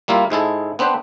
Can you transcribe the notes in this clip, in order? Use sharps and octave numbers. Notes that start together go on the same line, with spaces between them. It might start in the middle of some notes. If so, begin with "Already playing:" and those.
G3 A#3 E4 F4
G#2 G#3 E4 A4
B3 C4 D4 B4 C5